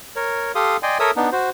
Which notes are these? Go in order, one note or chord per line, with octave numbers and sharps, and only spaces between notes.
A#4 C#5
G4 A4 F5 C6 D#6
D5 D#5 G5 G#5 C6
A4 A#4 C#5 E5 D#6 E6
B3 D4 D#4
F#4 C5